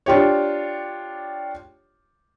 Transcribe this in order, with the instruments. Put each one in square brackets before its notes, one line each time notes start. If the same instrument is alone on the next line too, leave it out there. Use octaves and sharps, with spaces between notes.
[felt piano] D4 F4 G4 C#5